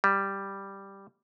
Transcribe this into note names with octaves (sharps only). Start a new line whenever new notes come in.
G3